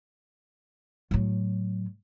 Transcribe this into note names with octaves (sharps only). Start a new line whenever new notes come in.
A2 F#3